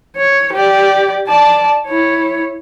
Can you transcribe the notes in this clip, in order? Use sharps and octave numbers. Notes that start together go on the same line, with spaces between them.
C#5
G4 D5
D5 A5
E4 C#5